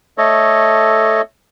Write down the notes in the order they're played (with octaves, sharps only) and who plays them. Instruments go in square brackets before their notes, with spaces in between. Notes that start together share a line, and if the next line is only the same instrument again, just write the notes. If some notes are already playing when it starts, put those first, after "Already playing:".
[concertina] A3 A4 C#5 D#5